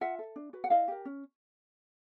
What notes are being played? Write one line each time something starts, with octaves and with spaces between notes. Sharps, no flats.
F4 E5 F#5
A4
D4
F#4 B4
F#5
E4 D#5 F5
G4 A#4
C#4